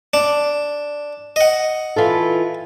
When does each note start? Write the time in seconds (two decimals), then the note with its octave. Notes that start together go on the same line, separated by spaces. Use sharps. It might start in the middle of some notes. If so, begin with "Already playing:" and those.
0.14 D4
1.36 D#5 F#5
1.96 E3 F4 A4